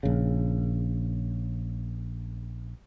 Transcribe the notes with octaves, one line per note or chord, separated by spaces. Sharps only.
A#1 C#3